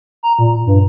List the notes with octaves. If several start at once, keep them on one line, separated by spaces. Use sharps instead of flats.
A#5
A#2
G2